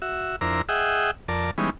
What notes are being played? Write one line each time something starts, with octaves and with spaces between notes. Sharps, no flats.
F#4 E5
F2 D4 E4 A#4 C5 A#5
G#4 D#5 E5 F#5 G5
F2 A#4 D5 A5
E3 G3 G#3 B3 C#4 D#4